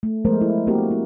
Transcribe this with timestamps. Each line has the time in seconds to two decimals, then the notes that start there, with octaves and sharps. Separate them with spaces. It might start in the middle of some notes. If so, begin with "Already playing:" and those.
0.03 A3
0.25 F3 G#3 A3 B3 A#4 C5
0.41 E4
0.67 A3 A#3 C4 F#4 G4 A#4
0.91 B3 E4